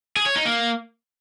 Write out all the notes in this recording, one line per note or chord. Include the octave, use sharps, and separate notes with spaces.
G#4
C#5
D#4
A#3